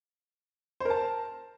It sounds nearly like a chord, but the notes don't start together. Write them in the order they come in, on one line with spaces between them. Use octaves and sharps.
C5 A#4 A5